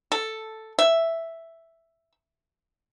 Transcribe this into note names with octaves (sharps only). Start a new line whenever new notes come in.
A4
E5